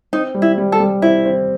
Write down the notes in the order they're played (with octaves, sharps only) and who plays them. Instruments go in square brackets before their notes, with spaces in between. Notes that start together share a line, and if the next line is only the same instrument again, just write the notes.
[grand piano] C4 [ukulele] D#4
[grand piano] G3
[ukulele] E4
[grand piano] G3
[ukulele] A4
[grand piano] G3
[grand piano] C4 [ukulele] E4
[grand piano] C4